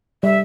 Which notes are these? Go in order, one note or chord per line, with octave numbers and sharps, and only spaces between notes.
G3 E5